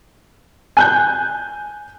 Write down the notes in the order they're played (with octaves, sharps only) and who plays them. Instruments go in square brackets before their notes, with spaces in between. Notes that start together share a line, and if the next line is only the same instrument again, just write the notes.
[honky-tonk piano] G#5 F#6 G6